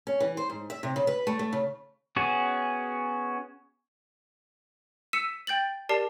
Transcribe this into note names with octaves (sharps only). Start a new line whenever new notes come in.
C#4
E3
C5
G#2
E5
C3
C#3
B4
A3
A3
C#3
B3 C#4 F#4 G#4
E6 B6 C#7 D#7 E7
G5 G6 A6 F#7
G4 A#4 D5 A5 C7